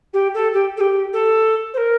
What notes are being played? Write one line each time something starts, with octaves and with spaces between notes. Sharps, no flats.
G4
A4
G4
A4
G4
A4
C5
A#4